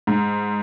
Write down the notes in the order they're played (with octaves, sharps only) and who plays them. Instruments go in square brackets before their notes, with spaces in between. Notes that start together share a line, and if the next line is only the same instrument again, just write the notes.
[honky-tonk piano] G#2